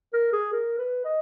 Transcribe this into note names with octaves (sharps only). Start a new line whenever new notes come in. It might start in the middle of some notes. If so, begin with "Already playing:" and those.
A#4
G#4
A#4
B4
D#5